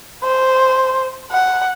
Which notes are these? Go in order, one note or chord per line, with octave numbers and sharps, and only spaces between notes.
C5
F#5